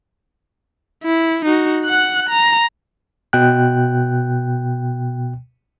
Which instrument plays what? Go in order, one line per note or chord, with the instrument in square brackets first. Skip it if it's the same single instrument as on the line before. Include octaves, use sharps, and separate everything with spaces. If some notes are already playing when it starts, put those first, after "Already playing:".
[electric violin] E4
D#4 F#4
F#5 F#6
A#5
[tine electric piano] B2 G5 F#6